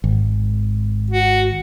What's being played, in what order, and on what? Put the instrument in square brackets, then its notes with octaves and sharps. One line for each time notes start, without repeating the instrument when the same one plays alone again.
[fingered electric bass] G#1
[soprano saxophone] F#4